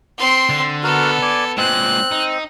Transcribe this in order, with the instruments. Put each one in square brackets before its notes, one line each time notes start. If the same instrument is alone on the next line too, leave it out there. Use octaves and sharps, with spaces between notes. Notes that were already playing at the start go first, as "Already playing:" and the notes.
[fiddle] C4 C6
[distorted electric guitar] D3
[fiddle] B3 A4 [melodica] F#4 A#4
[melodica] D5 G#5
[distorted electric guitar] A#2 G#3 [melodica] C4 [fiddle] F#6
[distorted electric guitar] D#4